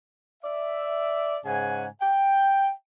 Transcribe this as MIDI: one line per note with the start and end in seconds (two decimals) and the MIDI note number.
0.43 1.37 74
0.43 1.37 76
1.45 1.86 44
1.45 1.86 49
1.45 1.86 78
1.45 1.86 80
2.01 2.71 79